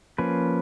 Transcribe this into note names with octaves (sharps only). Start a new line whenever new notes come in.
F3 A#3 C#4 B4